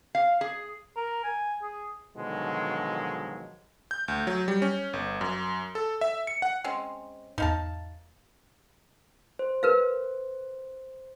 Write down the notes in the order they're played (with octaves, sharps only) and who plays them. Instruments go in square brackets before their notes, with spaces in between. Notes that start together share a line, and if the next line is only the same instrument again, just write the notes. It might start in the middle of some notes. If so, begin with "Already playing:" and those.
[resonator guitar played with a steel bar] F5
G#4
[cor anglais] A#4
G#5
G#4
[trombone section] B2 D3 D#3 F3 F#3 G#3
[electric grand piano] G6
D2
F#3
G3
C#4
G1
F#2
A4
E5
C#7
F#5
[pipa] G#3 C4 C#4
[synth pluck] E2 G#2 [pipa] D#4 F5 A5
[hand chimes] C5
[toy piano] A#4 B4 F5